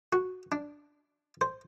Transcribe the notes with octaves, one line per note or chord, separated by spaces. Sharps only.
F#4
D4
C5